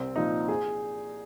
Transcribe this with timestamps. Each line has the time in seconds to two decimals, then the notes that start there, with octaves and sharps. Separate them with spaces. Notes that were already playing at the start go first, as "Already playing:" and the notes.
Already playing: C2 C4
0.15 A#2 F3 D#4
0.48 G#4